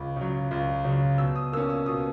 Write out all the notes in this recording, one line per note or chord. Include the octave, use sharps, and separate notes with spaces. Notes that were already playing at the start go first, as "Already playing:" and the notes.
Already playing: C#2 B5
C#3 F#3
C#2
C#3 F#3
B2 E6
D#6
A#3 C#4 E6
E6
B2 D#6